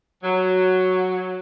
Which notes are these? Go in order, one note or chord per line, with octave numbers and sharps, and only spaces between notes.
F#3